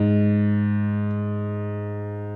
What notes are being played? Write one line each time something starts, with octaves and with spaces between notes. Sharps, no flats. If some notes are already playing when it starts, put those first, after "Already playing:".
Already playing: G#2